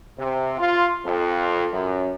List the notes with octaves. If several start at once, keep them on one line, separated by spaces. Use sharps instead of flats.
C3
F4
F2
F#2